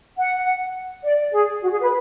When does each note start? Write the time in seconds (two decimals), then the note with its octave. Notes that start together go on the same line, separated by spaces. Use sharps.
0.17 F#5
1.04 D5
1.32 G#4
1.62 F#4
1.71 G#4
1.81 B4